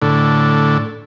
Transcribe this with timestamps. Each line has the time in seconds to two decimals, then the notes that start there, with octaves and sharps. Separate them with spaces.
0.02 A2 D3